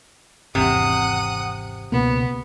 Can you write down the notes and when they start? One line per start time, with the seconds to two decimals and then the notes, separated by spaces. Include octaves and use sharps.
0.55 G#1 E2 C3 F#5 D#6
1.92 C#2 B2 A#3 B3